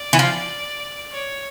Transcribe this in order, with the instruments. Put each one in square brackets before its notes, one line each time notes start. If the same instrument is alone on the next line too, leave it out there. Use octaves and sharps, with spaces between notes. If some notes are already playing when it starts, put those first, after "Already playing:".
Already playing: [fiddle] D5
[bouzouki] E3
F3
[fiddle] C#5